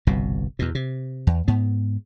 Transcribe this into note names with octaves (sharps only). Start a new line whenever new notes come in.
G1 C2 B2
E2 B2
C3
E2
G#2 B3